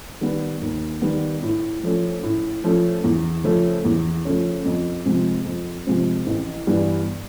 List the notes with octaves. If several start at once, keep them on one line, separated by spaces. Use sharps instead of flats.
D#3 G3 B3
D#2
D#3 G3 B3
A2
F3 A3 C#4
A2
F3 A3 C#4
E2
C#3 F3 A3 C#4
E2
C#3 F3 A3 C#4
F2
C3 F3 G#3 C4
F2
C3 F3 G#3 C4
A1
G2 E3 G3 B3